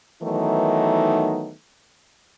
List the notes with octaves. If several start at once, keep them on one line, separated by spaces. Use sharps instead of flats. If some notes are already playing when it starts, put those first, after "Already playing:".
D#3 E3 F#3 A3 B3 D#4